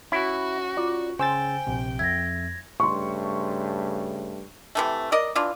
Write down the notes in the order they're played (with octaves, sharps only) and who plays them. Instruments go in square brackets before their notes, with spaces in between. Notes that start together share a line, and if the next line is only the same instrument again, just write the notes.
[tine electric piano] C#4 [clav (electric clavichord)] E4 [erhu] F#4
[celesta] F4 [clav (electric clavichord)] D5
[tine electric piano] C#3 E6 A6 [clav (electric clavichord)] C5 [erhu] G5 [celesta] G#5
[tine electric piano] A#1 C3
[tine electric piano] F2 E5 [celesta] G#6 A#6
[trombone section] G2 C#3 A3 [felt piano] C6 C#6
[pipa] C3 E3 A3
A#4 D5 D#5
E3 D4 F4